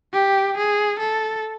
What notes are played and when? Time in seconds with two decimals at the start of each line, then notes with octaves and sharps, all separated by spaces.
0.14 G4
0.57 G#4
1.00 A4